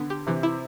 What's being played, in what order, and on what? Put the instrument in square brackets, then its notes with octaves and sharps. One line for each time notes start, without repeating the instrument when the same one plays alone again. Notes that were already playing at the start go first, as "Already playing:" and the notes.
Already playing: [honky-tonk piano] D3 [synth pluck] B3
[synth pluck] G4
[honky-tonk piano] C3 [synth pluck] E3
[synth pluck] E4